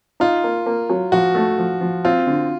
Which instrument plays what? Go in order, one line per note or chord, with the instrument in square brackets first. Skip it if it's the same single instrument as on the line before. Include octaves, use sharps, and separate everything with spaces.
[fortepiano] D#4 [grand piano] F4
[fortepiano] A#3
A#3
F#3
[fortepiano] F3 [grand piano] F#4
[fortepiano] A3
F3
F3
[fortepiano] C4 [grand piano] F4
[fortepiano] D3